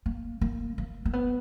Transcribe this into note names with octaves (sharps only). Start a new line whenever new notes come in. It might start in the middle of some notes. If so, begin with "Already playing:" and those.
A#3
A#3
A#3
A#3
B3